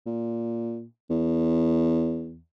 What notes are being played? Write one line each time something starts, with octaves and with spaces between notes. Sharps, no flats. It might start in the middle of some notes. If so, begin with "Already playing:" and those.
A#2
E2